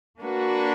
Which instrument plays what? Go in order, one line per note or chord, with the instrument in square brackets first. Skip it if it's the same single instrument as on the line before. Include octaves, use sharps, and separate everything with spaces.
[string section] A#3 D4 F#4 B4